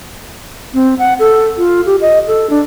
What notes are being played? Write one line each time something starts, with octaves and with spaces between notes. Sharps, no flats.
C4
F#5
A4
F4
G4
D#5
A4
D4